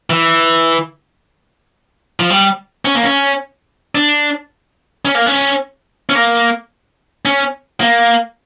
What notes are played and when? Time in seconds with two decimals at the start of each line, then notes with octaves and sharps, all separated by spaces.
0.10 E3
2.20 F3
2.30 G3
2.85 C#4
2.95 A#3
3.03 C#4
3.95 D4
5.05 C#4
5.15 A#3
5.26 C#4
6.09 C#4
6.15 A#3
7.25 C#4
7.80 A#3